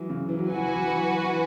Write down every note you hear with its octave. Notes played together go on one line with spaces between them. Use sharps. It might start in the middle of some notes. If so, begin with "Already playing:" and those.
Already playing: E3 F#3 G#3
C#3
E3
F#3
E3 F#4 B4 G#5
F#3
E3
F#3
E3
E3